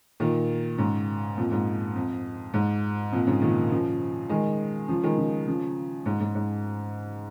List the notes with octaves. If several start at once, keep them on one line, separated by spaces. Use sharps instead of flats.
A#2 D#3
G#2 C#3
F2 A#2
G#2
F2
G#2
F2 A#2
G#2 C#3
A#2 D#3
C#3 F3
D#3 G#3
C#3 F3
D#3 G#3
C#3 F3
C#3 F3
G#2
G#2
G#2